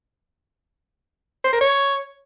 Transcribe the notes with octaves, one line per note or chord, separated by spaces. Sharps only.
C5
A#4
C#5